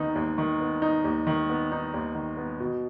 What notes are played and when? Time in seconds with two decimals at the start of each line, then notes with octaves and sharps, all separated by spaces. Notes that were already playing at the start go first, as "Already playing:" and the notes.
Already playing: D#2 D#3 B3 D#4
0.15 D#2
0.38 D#3
0.60 B3
0.82 D#4
1.04 D#2
1.27 D#3
1.50 B3
1.72 D#4
1.94 D#2
2.15 D#3
2.37 B3
2.60 B2